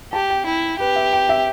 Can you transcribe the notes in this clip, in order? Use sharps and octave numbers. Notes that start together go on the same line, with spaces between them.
G4 A5
G5
E4 G5
G4 B4
E5
G5
E5